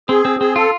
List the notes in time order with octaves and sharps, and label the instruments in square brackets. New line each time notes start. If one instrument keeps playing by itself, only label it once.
[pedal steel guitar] C4 [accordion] G#4
[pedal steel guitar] C4
[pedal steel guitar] C4 [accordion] G#4
[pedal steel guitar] F4 [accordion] A4